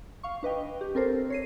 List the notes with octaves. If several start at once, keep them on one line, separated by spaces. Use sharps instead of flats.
F5 C#6
D4 B4 D#5 G5
G4
C4 A4 A#4 C5
C#5 C7 D#7